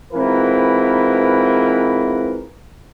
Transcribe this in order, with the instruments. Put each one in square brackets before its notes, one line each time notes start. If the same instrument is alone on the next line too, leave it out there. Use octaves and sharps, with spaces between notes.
[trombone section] G#2 E3 C4 F4 A#4 B4